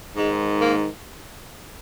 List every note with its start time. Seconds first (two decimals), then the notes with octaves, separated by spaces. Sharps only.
0.15 G#2 D#3 G#3
0.60 A#3